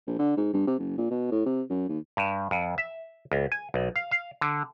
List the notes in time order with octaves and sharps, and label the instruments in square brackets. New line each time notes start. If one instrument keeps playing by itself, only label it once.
[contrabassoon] A#1
D3
G#2
G2
C3
F#1
A#2
B2
A2
C3
F#2
D#2
[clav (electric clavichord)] G2
F2
E5
C#2
G#5
B1
F5
F5
D3